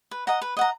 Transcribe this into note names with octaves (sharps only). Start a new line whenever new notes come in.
B4
D#5 F#5 A#5
B4
D#5 F#5 A#5